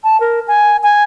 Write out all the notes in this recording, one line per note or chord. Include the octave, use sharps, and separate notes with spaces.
A5
A#4
G#5
G#5